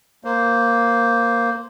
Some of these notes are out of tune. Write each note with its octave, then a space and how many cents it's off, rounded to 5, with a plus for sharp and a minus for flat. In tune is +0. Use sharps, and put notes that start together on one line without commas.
A#3 +0 C5 +0